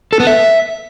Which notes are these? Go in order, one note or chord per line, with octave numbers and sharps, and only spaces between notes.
A4
B3
E5